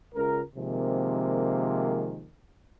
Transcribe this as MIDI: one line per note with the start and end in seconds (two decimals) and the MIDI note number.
0.15 0.41 37
0.15 0.41 70
0.56 2.26 48
0.56 2.26 51
0.56 2.26 53
0.56 2.26 56
0.56 2.26 58
0.56 2.26 60